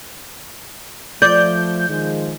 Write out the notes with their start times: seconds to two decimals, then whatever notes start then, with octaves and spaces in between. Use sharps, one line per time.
1.22 F3 A3 D5 G6
1.89 D#3 F3 G#3